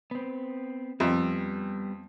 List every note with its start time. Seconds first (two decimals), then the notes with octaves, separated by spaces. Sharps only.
0.11 B3 C4
1.00 F2 G3 B3